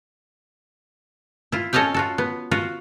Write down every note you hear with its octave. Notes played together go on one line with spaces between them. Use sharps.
E4 F4
C#4 A4 C#5 D#5 F5 G5
F4 F#4 A4
B3
F4 F#4